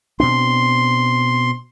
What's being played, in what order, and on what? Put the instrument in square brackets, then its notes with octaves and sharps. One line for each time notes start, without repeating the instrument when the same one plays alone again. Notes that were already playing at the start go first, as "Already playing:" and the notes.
[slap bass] B2 C4 D4 [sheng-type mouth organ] C6